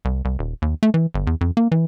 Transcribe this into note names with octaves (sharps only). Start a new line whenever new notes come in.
C2
C2
D#1
D#2
A3
E3
G1
E2
F2
A#3
E3